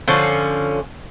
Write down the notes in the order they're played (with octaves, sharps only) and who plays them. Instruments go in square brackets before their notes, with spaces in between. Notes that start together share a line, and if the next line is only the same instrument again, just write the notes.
[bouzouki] D3 F3 C#4